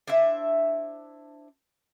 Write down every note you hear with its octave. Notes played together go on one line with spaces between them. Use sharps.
D4 E4 C5 E5